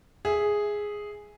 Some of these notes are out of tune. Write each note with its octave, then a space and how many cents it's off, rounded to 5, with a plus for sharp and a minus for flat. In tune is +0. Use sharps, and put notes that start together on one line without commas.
G#4 +0 E5 +0